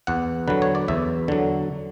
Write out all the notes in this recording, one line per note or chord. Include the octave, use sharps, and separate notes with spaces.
E2 F#5
D3 F#3 B4
C#5
D5
E2 E5
D3 F#3